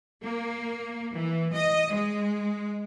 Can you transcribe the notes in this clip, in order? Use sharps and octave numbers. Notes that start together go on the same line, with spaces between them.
A#3
E3
D#5
G#3